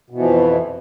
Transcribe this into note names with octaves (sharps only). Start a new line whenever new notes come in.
F2 B2 E3 F3